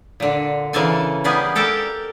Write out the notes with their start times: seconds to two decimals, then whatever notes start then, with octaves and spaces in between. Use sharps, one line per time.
0.20 A#2 D3
0.73 C#3 E3 A#3 A4 G#5
1.24 G3 A#3 B3 G#4
1.55 G4 A4 A#4 G5 A5